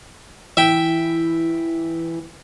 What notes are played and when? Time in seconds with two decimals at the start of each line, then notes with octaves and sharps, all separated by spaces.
0.57 E3 E5 G5